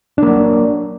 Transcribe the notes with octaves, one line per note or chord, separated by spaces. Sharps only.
F#3 A#3 D4